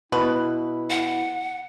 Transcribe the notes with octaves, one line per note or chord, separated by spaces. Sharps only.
B2 E4 B4
F#5